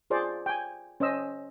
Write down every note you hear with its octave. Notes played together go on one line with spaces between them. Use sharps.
F4 G#4 C5 D5
G5 G#5
C#4 C5 D#5 E6